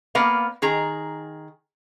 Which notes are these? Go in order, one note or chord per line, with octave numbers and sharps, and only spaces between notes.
A#3 B3 B4 D5 F5
D#3 G#4 A#5